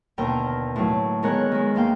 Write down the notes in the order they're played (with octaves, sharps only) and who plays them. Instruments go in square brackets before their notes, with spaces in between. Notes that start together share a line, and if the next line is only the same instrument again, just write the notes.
[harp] D#2 B2 D3 A#4 G5 A#5
A2 F#3
D#3 G#3 B3 A#4 C#5 F#6
D#3 G#3
D2 A#3 F5 G5